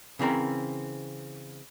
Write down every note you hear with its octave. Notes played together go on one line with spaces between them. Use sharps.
C#3 E3 C4 A#4